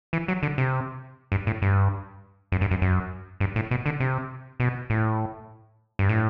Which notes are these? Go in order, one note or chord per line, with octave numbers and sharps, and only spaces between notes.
E3
F#3
D3
C3
G2
A2
G2
F#2
G2
F#2
F#2
G2
A2
B2
D3
C3
B2
A2
G2
A2